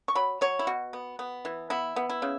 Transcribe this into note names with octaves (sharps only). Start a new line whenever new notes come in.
C#6
F#3 B5
F#3 C#5
E4
B2 F#4
B3
B3
E3
B3 E4
B3
E4
C#3